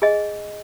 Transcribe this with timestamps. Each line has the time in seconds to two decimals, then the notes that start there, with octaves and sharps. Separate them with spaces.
0.02 G#4 D#5 G#5